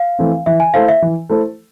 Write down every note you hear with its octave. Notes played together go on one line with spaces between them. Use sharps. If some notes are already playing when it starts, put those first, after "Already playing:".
Already playing: F5
E3 A3 C4
E3 E5
G#5
A3 E4 A4 C5 F5
E5
E3
A3 E4 A4 C5